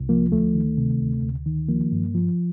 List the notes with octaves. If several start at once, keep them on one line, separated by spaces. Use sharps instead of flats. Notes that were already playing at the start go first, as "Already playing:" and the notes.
Already playing: C2
F3 A#3
D2 A3
D#3
C3
D2
D2
D#3
F3 A#3
G2
F3